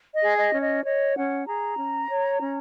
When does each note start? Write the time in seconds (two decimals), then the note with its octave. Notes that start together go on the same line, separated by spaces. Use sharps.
0.15 D#5
0.22 G#4
0.38 D#5
0.54 C#4
0.61 D#5
0.84 C#5 D#5
1.15 C#4 F#5
1.46 G#4 A#5
1.78 C#4
2.09 C#5
2.41 C#4